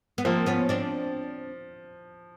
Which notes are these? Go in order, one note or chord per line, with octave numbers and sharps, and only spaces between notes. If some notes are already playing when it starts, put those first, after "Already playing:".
B3
F3 A#3 C4
B3 C#4
C4 D4